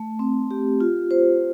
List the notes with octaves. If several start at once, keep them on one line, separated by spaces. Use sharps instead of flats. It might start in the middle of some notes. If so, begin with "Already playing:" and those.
Already playing: A3
C4
G4
F4
C5